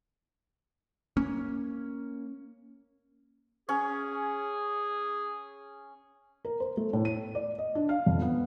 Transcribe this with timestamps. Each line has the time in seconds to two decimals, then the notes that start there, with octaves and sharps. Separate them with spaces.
1.17 A#3 C#4
3.69 C#4 G#4
6.45 A#4
6.60 C5
6.77 A3
6.93 A2
7.05 D#7
7.35 D5
7.58 D#5
7.75 D4
7.89 F5
8.06 F2
8.22 B3